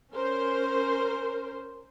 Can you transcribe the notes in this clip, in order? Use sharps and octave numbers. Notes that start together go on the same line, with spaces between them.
C#4 A#4 C5